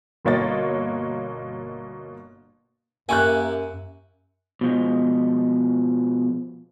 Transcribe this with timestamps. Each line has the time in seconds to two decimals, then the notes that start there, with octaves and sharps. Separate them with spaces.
0.25 G1 B2 A#3 C#5 D#5 A6
3.09 F#2 A#3 E4 G4 G#5 C#6 F#6
4.61 B2 F3 G#3